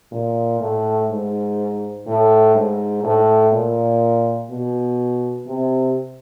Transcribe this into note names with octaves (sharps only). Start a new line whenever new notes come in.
A#2
A2
G#2
A2
G#2
A2
A#2
B2
C3